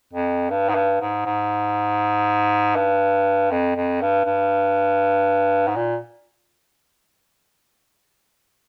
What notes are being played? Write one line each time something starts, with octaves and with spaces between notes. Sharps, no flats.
F2
G2
G#2
G2
G#2
G#2
G2
F2
F2
G2
G2
G#2
A#2